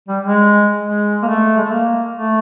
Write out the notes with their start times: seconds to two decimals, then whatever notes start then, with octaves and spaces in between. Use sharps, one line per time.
0.09 G3
0.24 G#3
0.84 G#3
1.23 A#3
1.28 A3
1.58 G#3
1.65 A3
1.72 A#3
2.17 A3